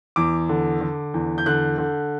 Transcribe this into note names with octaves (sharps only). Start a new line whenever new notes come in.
E2 D6
D3
D3
E2
G6
D3 F#6
D3